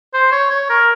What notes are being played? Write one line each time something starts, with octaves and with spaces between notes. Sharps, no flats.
C5
C#5
C#5
A#4